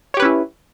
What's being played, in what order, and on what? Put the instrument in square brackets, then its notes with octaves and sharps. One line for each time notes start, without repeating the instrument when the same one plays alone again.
[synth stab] C#5
G4
B4
C#4
E4